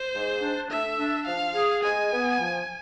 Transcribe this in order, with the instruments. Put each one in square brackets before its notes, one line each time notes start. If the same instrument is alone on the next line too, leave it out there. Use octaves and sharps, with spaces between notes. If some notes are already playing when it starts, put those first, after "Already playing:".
Already playing: [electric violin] C5
[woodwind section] G#2
D4
[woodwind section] A3 [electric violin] E5
[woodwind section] D4
[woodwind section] F3 [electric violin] F5
[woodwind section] G#4
[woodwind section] G#3 [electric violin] G#5
[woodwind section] B3
F3